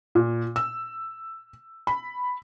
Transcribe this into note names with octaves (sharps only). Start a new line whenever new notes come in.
A#2
E6
B5